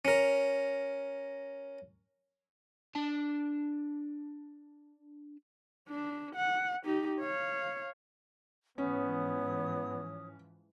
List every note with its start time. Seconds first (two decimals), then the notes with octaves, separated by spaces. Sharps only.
0.05 C#4 A#4
2.95 D4 A5
5.88 D4
6.36 F#5
6.84 D#4 G4
7.20 C#5 F5
8.78 G#2 E3 F3 B3 C#4 C#5 D#6